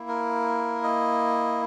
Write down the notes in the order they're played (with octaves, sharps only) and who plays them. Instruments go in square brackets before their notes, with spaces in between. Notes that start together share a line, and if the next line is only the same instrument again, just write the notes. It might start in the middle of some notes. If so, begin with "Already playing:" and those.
Already playing: [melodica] A#3 E4
A#4
D#5